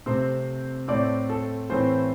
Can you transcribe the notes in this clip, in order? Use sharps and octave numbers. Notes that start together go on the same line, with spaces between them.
C3 A3 C4 C5
A2 A3 C4 D5
A4
A2 E3 A3 C4 C5